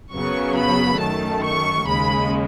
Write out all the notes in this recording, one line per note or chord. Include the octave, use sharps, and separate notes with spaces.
F#2 C#3 F#3 B3 C#6
B5
F#2 D#3 A3 A5
C#6
D#2 C#3 G#3 B5